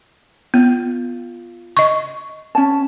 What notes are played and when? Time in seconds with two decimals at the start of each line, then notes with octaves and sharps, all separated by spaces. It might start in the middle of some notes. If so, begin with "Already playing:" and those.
0.54 B3 F4
1.77 D#5 C#6
2.55 C#4 G#5 A5